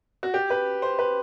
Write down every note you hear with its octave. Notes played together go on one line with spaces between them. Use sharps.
F#4
G4
B4
C5
B4